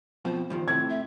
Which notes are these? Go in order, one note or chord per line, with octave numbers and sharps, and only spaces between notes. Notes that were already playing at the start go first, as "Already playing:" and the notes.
F2 B2 F3 C5
G2 D#3 F3
A2 C3 A3 E4 G#6
E5